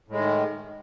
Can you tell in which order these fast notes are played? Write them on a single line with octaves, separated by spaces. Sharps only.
A2 G#3 D#3